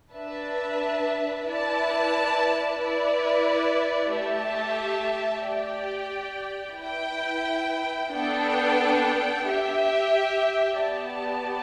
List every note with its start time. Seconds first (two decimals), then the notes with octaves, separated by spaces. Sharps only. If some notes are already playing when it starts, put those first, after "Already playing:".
0.13 D4 B4 E5 A5
1.47 E4 B4 D5 A5
2.79 E4 B4 D5
4.12 A3 G4 E5 A5
5.45 G4 D5 G5
6.78 E4 B4 G5
8.11 B3 D4 A4 G5
9.44 G4 E5 G5
10.77 B3 G4 D5 A5